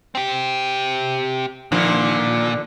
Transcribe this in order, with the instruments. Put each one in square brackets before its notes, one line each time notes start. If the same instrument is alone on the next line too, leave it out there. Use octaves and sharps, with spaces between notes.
[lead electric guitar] C4 G4
[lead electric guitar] A#2 [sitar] D3 D#3 F3